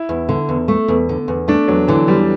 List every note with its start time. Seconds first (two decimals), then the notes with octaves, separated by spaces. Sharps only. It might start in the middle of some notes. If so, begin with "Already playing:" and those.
Already playing: E4
0.09 E2
0.29 D3
0.49 E2
0.68 A3
0.88 E2
1.09 D3
1.28 E2
1.48 A3 D4
1.68 E2 F#3
1.88 D3 E3
2.07 E2 G3